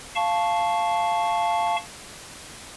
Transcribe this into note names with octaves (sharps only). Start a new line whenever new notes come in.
F5 A5 C#6